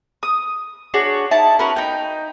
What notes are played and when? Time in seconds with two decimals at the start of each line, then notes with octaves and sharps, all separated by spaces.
0.23 D#6
0.94 D4 F#4 G#4 C#5
1.31 D#4 E4 A5
1.59 C#4 F#4 A#4 B4
1.76 D#4 G5